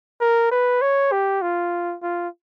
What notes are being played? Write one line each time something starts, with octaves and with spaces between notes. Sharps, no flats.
A#4
B4
C#5
G4
F4
F4